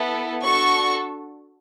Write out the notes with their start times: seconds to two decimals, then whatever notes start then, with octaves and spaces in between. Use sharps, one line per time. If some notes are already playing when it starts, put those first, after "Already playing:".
Already playing: B3 E4 A4
0.44 D4 F#4 A4 C#6